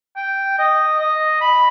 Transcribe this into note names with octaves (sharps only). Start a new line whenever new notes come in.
G5
D#5
D#5
B5